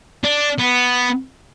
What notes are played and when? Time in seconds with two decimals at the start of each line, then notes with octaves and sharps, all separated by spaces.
0.24 D4
0.58 B3